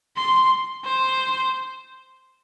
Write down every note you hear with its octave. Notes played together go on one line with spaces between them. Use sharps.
C6
C5